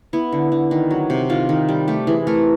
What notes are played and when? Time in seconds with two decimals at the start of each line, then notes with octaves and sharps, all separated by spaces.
0.13 B3 E4
0.32 D3
0.52 D3
0.71 D#3
0.91 F#3
1.10 C3
1.29 D#3 F4
1.49 D#3
1.69 G3
1.88 A3 G4
2.07 E3 G#4
2.27 A3 A#4